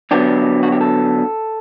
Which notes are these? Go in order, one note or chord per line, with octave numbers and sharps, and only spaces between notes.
D3 F#3 B3 D4 G4
F#4
G4
A4